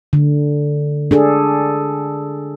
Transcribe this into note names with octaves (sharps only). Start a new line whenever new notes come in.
D3
D4 G#4 A4